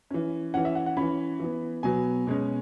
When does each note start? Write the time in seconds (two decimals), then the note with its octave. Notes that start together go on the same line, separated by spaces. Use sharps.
0.10 E3 C#4
0.54 E3 C#4 F#5
0.65 E5
0.75 F#5
0.86 F#5
0.97 E3 C#4 B5
1.40 E3 B3
1.83 B2 F#3 B3 G#5
2.27 B2 G#3 C#4